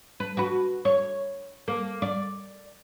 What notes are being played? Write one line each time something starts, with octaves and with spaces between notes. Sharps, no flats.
B4
F#4 B4
C#5
A#3
D5